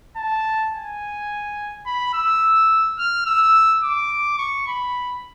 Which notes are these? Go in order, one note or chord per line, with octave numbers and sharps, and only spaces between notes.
A5
G#5
B5
E6
F6
E6
D6
C#6
B5